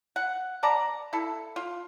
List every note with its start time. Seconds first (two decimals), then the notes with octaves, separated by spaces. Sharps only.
0.16 F#5
0.63 B3 D5 A5 A#5
1.13 E4 A4
1.56 F4